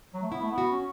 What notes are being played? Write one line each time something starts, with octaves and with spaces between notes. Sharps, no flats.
F#3
A3
B3 E4
A3
B3
F#4
C#4